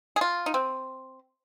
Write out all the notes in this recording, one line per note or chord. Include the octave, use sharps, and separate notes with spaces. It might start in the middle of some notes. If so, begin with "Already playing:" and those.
G#4
F4
D#4
C4